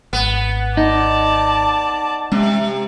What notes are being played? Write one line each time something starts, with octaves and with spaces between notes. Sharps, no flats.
G#1 B3
D#4 D5 A5
C3 G#3 C#4